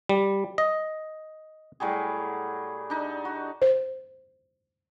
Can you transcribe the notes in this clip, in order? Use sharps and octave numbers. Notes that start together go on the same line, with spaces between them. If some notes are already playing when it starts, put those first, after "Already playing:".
G3
D#5
A2 F#3 G3 G#4
D4 D#4
F#4
C5